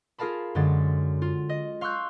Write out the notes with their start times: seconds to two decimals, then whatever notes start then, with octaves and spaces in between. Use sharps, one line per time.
0.18 F4 G#4 A#4 F5 A5 B5
0.55 F#2 D3 G#3 A6
1.22 F4
1.49 D#5
1.81 F5 C6 C#6 E6 F#6 G6